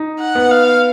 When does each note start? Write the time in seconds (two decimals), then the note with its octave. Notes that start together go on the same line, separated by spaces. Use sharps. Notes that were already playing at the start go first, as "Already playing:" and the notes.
Already playing: D#4
0.20 F#5
0.35 B3
0.51 F5